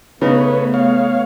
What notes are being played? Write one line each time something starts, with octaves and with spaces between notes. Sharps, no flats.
C#3 A3 B3 D#4 B4 C#5
C#5 F5